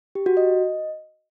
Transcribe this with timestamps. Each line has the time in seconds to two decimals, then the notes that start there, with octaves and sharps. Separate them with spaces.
0.15 G4
0.26 F#4
0.37 D#5